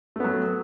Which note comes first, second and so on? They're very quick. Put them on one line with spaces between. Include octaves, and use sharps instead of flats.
A3 B3 F#3